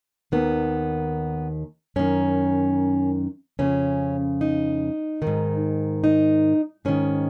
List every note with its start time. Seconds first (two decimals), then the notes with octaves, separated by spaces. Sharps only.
0.32 D#2 D#3 B3
1.96 F#2 D#3 C#4
3.59 F2 C#3 C#4
4.41 D#4
5.22 G#2 D#3
6.04 D#4
6.85 G#2 D#3 C#4